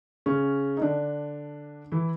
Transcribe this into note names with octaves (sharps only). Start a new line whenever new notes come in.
C#3 C#4
D#4
D3 D4
E3 E4